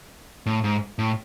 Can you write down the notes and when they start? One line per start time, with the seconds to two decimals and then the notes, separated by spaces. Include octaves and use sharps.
0.46 A2
0.64 G#2
0.99 A2